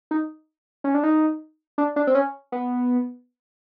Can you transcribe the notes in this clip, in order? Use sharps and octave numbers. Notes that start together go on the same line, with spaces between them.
D#4
C#4
D4
D#4
D4
D4
C4
C#4
B3